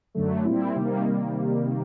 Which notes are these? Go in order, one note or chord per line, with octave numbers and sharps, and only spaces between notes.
F#2 D3 F#3 A3
A#2 G3 C4 E4
C3 D#3 G3 A#3